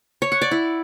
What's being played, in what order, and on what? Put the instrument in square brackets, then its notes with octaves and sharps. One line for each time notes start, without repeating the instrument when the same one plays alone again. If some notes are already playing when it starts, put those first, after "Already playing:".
[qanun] C#5
F#5
D5
E4